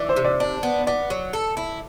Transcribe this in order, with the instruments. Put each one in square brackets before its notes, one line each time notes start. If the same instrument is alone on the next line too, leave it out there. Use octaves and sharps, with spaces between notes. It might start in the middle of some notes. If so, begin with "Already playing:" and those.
Already playing: [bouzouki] E3 [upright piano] D5
[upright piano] C5
[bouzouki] C3
[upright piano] D5
[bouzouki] D4 [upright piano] D5
[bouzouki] B3
[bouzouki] B3 [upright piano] D5
[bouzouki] F#3
A4
E4